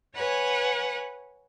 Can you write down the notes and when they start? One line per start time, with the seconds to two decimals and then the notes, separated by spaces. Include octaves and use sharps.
0.15 B4 C#5 F#5 G#5